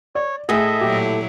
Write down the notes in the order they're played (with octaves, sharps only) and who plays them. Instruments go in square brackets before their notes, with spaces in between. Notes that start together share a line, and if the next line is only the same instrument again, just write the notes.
[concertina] C#5 [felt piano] D5
[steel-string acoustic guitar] A2 A4 [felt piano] G#4 [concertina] D#5 E5
[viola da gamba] A#2 F#3 E4 [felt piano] G4